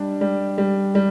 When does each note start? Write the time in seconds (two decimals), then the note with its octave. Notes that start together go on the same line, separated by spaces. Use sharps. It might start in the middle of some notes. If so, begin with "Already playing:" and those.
Already playing: G3 D4
0.21 G3
0.58 G3
0.95 G3